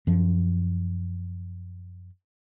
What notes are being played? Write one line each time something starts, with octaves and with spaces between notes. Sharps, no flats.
F#2 F3